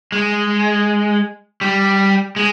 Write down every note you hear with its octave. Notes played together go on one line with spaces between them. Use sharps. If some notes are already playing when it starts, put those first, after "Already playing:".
G#3
G3
G#3